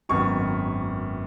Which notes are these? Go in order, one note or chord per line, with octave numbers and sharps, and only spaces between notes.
G#1 F#2 D#3 B3 C#6